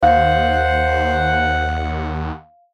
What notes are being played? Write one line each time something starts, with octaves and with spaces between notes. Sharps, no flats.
D#2 C5 F5 F#5